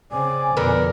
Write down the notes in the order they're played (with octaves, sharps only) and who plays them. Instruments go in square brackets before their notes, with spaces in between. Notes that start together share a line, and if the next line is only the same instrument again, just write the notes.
[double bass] C#3 C4 [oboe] D5 [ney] G#5
[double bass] F2 B2 [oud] D3 B3 [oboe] A#4